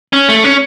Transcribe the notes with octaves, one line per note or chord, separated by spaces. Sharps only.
C#4
A3
C#4